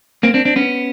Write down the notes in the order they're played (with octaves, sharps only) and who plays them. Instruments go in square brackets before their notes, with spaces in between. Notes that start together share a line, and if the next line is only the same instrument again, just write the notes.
[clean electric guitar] A#3 C4
C4 D4
C4 D4
B3 C#4